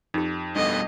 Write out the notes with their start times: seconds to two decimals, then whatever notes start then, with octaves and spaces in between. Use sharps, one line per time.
0.14 F2 D#4 G4
0.56 G2 B2 D4 A4 D#5